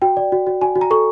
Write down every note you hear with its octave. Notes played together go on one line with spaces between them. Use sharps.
F#4 G5
D5
F#4
F#4
F#4 G#5
F#4
A#5
A4 C#6